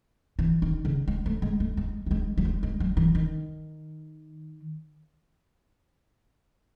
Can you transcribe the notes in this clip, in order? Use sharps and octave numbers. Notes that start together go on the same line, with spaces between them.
E3
D#3
C#3
G#3
A3
G#3
A3
G#3
F#3
G#3
F#3
G#3
G#3
F#3
E3
D#3